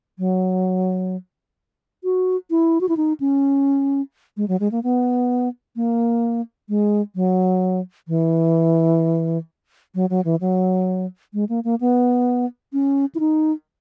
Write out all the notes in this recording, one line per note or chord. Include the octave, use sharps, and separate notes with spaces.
F#3
F#4
E4
F#4
E4
D#4
C#4
G#3
F#3
G#3
A#3
B3
A#3
G#3
F#3
E3
F#3
F#3
E3
F#3
G#3
A#3
A#3
B3
C#4
E4
D#4